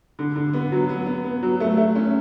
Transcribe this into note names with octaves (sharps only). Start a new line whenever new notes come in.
D3
D3
B3
F#3
B3
B3
B3
F#3
A3
A3
C#4